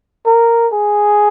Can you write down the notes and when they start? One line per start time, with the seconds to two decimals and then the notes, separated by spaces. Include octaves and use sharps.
0.26 A#4
0.73 G#4